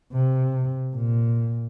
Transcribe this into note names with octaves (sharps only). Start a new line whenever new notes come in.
C3
A#2